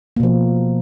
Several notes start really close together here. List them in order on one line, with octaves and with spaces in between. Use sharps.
A#3 B2 F3